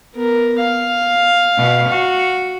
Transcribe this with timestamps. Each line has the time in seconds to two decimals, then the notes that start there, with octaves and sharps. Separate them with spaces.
0.14 B3 A#4
0.60 F5
1.57 B2
1.89 F#4